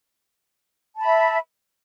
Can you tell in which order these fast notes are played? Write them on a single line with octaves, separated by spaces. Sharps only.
A5 B5 E5